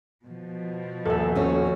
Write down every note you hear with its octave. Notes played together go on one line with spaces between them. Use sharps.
B2 F3
D#1 A4 E5
C#4 F#4 C#5